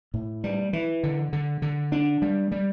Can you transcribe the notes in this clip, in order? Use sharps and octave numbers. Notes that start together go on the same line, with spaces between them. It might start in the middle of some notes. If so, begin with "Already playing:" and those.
A2
G3
E3
D3
D3
D3
D4
G3
G3